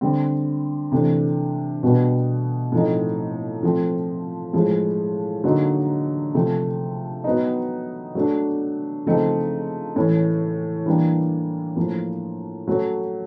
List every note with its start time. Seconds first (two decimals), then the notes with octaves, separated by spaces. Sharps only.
0.01 D3 G3 C4
0.92 C3 E3 A3 D4
1.83 B2 G3 B3 D4
2.72 A2 F3 A3 C4 D#4
3.63 F3 A3 C4
4.53 A2 F3 G#3
5.44 D3 F#3 A#3 D#4
6.34 C3 F3 A3
7.24 F#3 B3 D#4
8.15 F#3 A3 D4
9.06 C#3 F3 A3 C4 D#4
9.96 A2 E3 A3 C#4
10.86 E3 G3 A#3 D4
11.76 A2 F3 A#3
12.68 F#3 A3 C#4